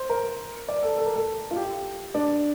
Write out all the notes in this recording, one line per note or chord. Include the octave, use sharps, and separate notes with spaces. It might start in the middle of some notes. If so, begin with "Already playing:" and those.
Already playing: C5
A#4
D5
A4
A4
A#4
A4
F4
G4
D4